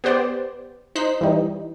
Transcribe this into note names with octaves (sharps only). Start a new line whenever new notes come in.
B3 G4 C5 D5
D#4 C5 F#6 B6
E3 G3 D#4